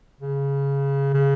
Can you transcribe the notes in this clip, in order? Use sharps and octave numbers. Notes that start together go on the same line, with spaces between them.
C#3
C#3